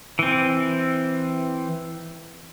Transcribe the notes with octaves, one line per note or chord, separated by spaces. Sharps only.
E3 C4